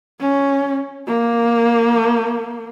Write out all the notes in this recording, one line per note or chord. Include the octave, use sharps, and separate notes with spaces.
C#4
A#3